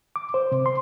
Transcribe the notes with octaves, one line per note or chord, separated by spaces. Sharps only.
D6
C5
C3
C6